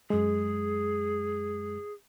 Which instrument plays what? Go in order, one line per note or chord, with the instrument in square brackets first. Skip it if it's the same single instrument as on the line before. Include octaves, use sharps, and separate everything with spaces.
[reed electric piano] F#2 G#3 [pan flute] G#4